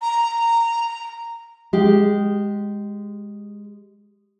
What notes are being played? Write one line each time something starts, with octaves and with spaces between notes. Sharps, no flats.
A#5
G#3 G4